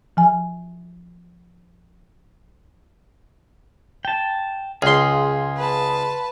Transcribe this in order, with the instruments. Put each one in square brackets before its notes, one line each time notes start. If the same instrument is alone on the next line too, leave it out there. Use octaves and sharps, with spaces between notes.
[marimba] F3 G#5
[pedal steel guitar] G5 A5
[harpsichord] C#2 [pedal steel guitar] G#4 [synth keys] F5 C6
[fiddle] B4 A5